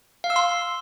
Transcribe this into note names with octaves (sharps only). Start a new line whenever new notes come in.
F5
E6
C6